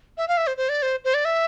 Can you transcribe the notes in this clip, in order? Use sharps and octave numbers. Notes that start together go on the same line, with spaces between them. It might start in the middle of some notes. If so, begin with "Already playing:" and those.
E5
F5
E5
C5
C5
D5
C5
C5
D5
E5